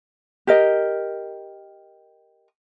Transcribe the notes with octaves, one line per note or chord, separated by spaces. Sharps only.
G4 A#4 D#5